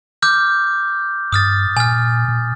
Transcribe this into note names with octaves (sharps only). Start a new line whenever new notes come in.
D6 F6 G6
G2 D#6 F6 A6
A#2 G#5 F6
A#2